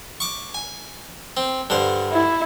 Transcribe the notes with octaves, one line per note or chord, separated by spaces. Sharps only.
C#6 D6
G#5
C4
G2 D3 C5
E4